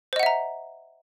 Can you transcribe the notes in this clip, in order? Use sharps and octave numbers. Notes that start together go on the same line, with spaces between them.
C5 D#5 E5 F#5 A#5